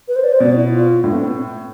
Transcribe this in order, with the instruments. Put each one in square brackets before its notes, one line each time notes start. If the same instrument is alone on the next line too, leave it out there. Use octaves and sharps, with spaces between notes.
[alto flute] B4
C5
D5
C5
[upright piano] B2 [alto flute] D5
[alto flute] E4
F4
[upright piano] A2 [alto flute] D4
[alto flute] B3
C4